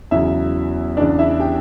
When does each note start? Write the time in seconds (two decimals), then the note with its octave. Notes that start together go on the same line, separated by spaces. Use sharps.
0.11 E2 C#3 F#3 E4 E5
0.97 E2 C#3 E3 D4 D5
1.19 E4 E5
1.40 G4 G5